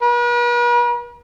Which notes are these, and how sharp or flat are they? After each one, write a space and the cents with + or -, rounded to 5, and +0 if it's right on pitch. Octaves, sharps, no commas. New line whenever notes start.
B4 -45